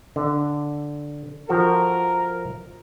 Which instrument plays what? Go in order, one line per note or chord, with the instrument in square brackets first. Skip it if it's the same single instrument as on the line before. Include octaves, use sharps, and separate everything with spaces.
[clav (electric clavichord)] D3
[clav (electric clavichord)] F3 F#4 A4 [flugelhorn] A#4